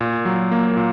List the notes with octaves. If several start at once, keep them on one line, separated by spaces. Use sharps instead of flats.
A#2
F#3
A#3
A#2